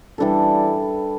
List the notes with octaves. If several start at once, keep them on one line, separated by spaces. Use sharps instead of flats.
E3 G3 D4 A4